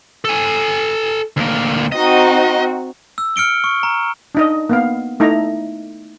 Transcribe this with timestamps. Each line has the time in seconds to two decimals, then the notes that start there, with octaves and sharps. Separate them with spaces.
0.25 A4 G#5
1.37 D2 A#3
1.92 C4 D#4 F#4 D#5
3.18 E6
3.36 F6 C#7 D7 G7
3.64 C#6
3.83 A#5
4.35 D4 D#4 D#5
4.69 A#3 B3 F5
5.20 A3 D#4 E4 A#5